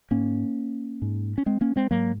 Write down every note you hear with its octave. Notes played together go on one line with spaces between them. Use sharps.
G#2 A#3 C#4
G#2
C#4
G#3 C4
A#3 C#4
G#3 C4
G#2 F#3 A#3